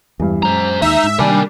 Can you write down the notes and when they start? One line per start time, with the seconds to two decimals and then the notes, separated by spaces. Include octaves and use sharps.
0.20 E2 G2 E3
0.43 F#2 G#3 C5 A#5
0.82 D#2 D#3 D#4 E5
1.04 G#2
1.19 C3 D#3 G3 A#3 D4 A#4 G#5